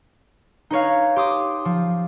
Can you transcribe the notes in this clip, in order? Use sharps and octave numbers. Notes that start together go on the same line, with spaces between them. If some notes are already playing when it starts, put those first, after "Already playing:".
D#4 B4 C#5 F5
G4 C6 D6 D#6
F3